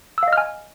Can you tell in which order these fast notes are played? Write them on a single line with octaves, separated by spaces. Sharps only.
E6 F5 D#5 F6 G#5